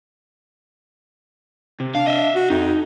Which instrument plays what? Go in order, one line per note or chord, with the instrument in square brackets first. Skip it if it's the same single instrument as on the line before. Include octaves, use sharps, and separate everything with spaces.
[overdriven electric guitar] C3
[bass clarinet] D4 [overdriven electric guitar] F5
[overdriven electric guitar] D#5 E5
[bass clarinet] F#4
[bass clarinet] F2 [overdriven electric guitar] D#4